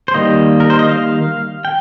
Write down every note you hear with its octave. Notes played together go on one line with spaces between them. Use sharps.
C5
D#3 G3 A#3 D#5
A#4
C5
D#5
F5
G5